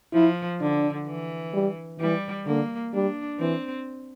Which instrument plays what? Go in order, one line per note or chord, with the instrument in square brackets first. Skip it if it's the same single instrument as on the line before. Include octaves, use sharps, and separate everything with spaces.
[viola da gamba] F3 [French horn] E4
[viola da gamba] D3 [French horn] D4
[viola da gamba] E3
[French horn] G3
[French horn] E3 [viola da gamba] G3
[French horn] D3 [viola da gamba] A#3
[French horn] G3 [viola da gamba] D4
[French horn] E3 [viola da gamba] C4